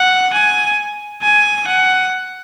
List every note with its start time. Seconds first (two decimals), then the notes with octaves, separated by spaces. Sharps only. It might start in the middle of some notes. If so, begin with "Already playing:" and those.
Already playing: F#5
0.34 G#5
1.23 G#5
1.67 F#5